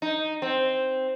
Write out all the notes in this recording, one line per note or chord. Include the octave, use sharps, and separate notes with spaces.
D#4
C4